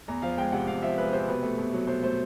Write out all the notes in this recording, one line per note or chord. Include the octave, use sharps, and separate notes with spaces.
E2 A#5
F3 F5
G#3 G5
C3 F#5
E2 F5
F3 E5
G#3 B4
C3 C5
B2 B4
A3
B2
F#3
B2 C5
A3 C5